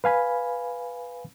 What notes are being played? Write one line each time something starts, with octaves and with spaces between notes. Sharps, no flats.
B4 F5 G#5 B5